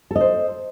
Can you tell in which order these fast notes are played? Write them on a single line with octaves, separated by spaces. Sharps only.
A4 D#5 C5